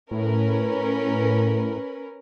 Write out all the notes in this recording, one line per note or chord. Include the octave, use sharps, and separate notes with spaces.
A2 C#4 A#4 B4